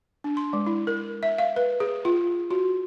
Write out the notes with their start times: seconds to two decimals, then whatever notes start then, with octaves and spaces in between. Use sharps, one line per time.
0.24 D4
0.37 C6
0.53 G#3
0.66 E4
0.87 A#4
1.23 E5
1.38 F5
1.56 B4
1.80 G#4
2.05 F4
2.51 F#4